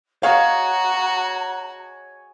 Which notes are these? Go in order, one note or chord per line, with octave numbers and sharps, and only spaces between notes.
F#4 C#5 F5 G#5 A#5 D#6